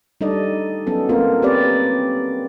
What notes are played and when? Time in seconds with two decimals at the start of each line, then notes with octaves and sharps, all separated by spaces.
0.21 G3 D4 D#4 A4 D5 D#5
0.87 F#3 B3 C#4 A4
1.09 A#3 C4 F4 A#4
1.42 C4 G4 B4 C#5 D5